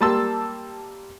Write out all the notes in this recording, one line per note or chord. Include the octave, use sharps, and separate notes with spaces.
G3 A#3 A5 C6 E6